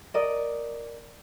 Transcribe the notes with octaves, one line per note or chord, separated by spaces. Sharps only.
A#4 D5 D#5